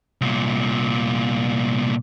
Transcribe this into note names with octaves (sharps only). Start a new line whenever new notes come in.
C2 A#2